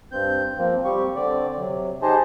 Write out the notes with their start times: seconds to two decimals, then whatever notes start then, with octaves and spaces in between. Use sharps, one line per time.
0.12 G2 C4 G6
0.58 F3 A#3 C4
0.85 G3 C4 G4 C#6
1.16 D3 C4 D5
1.58 C3 F#3
2.02 D#4 G4 G#4 C5 D#5 A5